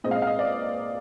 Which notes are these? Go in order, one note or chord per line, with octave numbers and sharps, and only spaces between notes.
A#2 G#3 C4 D#5
F5
D#5
F5
D#5
D5